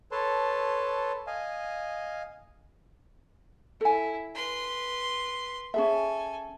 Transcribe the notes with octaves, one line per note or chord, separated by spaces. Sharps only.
A4 B4 C#5 A5 C6
D#5 F5 G#5
E4 A4 G#5
B4 C6
C#4 G#4 A4 E5 G#5